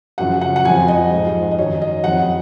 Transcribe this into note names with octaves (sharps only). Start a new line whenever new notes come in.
F#2 C#3 F3 F#5
F#5
F#5
F2 F3 G#5
D#5
G#2 F3
D#5
F#2 D#3 F#3 C#5
D#5
F2 F3 F#5